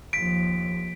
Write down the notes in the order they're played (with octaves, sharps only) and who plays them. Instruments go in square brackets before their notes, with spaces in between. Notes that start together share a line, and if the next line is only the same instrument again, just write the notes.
[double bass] D#2 F3 [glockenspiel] B6 D7